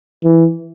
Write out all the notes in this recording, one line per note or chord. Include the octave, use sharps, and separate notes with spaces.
E3